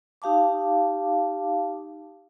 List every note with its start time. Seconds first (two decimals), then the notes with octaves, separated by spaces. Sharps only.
0.22 D#4 G4 F5 A5 D6